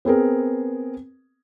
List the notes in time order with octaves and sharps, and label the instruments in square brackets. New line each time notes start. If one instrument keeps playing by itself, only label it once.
[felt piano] B3 C4 G#4 A#4